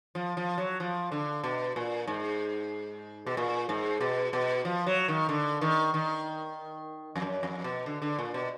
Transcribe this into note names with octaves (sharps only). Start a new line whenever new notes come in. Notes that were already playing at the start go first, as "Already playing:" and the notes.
F3
F3
F#3
F3
D3
B2
A#2
G#2
B2
A#2
G#2
B2
B2
F3
F#3
D#3
D3
D#3
D#3
F2
F#2
F2
B2
D3
D3
A#2
B2